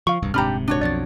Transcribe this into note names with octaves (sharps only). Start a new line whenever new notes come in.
F3 F5 C#6
E1 C2 G2
D#1 G#2 C3 D4 G4 A#5 B5 F6
D4 F#4 C#5
B1 F2 D5 A6